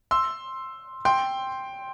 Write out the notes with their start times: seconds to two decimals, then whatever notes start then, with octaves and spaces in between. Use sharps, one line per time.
0.11 C6 E6
1.05 G5 C6